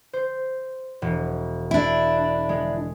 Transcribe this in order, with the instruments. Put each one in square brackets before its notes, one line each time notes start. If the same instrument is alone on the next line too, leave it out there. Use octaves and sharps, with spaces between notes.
[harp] C5
E1
[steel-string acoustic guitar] D4 E4
[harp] G#3